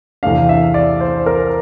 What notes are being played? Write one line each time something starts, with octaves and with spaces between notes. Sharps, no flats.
E2 C3 E3 A3 D4 F5
E5
D5
C5
A#4